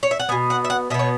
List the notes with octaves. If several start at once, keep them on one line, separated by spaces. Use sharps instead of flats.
C#5
E5
F#5
B2 B3 G#5
F#5
E5
F#5
B2 B3 E5
C#5